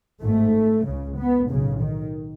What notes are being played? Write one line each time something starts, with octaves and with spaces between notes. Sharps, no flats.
G#1 G#2 A3
C#2 C#3
B3
B1 A2 C#3
D#3